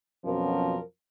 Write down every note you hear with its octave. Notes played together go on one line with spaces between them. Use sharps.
F2 B2 F3 F#3 C#4 A#4